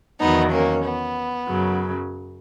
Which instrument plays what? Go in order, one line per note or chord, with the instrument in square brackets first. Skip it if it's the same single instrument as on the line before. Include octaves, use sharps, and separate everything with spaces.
[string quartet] E2 D#3 F#3 B3 D#4
A#3 C#4
B3
F#2 C#3 F#3